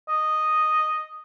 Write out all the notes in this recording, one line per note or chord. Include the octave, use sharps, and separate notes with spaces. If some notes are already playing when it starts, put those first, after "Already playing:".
D#5